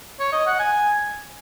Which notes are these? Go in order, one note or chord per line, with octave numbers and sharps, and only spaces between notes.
C#5
D#5
F#5
G#5